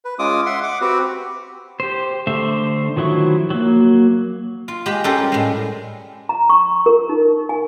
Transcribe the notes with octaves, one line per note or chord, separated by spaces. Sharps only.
B4
G#3 C#4 F4 D6 D#6
E5 F#5 C6
F#5 D6
C4 F#4 G4 B4
G4 C5
D3 A3 C5 E5
D#3 F3 F#3 E4 C#6
F#3 A#3
F4
G#3 G4 B5
G3 C#4 F4 G4 A4 A#4
A2 G#3
A#5
C#6
A#4
D#4
G#5